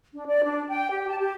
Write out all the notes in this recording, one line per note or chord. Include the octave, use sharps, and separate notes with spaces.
D4
D5
D4
G5
G4
A5
G4